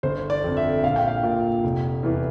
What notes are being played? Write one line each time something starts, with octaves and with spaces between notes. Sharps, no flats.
G1 C5
D5
F2 D3
E5
A#1 F5
G5
F5
A#2
F1
E2 E3